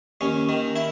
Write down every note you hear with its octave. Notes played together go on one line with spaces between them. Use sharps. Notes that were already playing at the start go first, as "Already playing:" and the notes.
D#2 C#4
D#3
E4